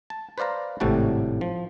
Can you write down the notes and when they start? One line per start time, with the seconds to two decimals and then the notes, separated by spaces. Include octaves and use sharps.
0.10 A5
0.38 B4 C5 D5 F5 A#5
0.80 G#1 A2 C3 G3 F#4 A5
1.41 F3